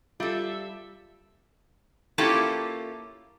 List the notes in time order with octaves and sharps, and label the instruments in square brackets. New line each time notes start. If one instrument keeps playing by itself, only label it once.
[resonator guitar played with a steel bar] G3 A4 [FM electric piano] F4 [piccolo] E5
[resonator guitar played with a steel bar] A#3 C#4 E4 F4 G4 A4